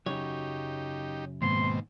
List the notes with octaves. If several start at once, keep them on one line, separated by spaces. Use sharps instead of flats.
F#2 C#3 F#3 D#4 G4 C#5
D#2 G#2 B2 C4 C6